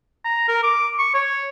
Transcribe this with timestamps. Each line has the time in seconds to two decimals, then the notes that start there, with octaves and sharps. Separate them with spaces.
0.24 A#5
0.48 A#4
0.63 D6
0.99 C#6
1.14 C#5